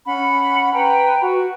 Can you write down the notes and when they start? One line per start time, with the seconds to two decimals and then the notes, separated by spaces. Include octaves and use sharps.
0.06 C#4 F#5 B5
0.74 B4 G5 A#5
1.21 F#4